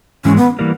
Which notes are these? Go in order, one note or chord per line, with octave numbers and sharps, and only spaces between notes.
G#2 E3 G#3 C#4
B3
E3 G3 A#3